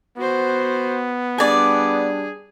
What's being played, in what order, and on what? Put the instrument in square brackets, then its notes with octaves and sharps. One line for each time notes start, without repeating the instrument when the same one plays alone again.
[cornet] B3 [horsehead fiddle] F#4 C5
[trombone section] G3 D4 [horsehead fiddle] G#4 [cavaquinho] D5 G#5